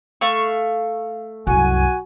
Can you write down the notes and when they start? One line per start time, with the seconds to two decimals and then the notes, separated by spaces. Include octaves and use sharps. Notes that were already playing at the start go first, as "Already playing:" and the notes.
0.21 A3 F5 C#6
1.47 C2 F#2 F#4 G#5